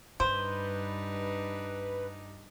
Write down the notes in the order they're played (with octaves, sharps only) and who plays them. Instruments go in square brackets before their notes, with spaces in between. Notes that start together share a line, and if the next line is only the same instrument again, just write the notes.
[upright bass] G2 [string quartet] G3 D4 D#4 [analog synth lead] B4 [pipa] C5